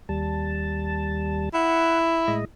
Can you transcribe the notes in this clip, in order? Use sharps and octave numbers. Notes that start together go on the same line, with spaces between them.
D#2 G3 A5
E4 F#5
A2 G#3 D#5